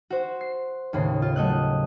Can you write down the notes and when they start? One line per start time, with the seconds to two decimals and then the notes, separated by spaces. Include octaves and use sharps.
0.10 F#4 C5
0.41 C7
0.93 D#2 A2 C#3 C7
1.22 F4
1.36 F#3 A3 D#5 F#6